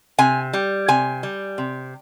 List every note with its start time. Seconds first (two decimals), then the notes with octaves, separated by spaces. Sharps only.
0.18 C3 G#5
0.53 G3
0.88 C3 G#5
1.23 G3
1.58 C3